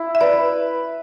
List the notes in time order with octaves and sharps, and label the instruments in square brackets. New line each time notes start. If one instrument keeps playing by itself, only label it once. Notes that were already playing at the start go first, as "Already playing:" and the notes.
Already playing: [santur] E4
[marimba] E5
[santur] B4 [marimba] D5